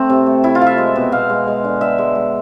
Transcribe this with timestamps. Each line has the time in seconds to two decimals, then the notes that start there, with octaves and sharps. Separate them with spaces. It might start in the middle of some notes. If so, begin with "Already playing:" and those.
Already playing: A3 C4
0.10 C3
0.26 A3
0.43 C3 E4
0.55 F4
0.61 F3 F5
0.67 E5
0.78 G#3
0.96 B2
1.12 B2 F5
1.29 G#3
1.47 G#3
1.64 D3
1.81 D3 E5
1.98 G#3
2.15 G#3